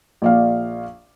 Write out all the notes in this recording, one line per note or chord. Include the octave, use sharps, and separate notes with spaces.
A#1 D5 F5